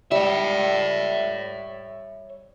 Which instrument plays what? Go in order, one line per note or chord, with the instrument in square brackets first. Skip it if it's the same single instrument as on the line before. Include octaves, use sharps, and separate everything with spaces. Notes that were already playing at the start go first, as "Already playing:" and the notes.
[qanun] G3 [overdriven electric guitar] C#5 E5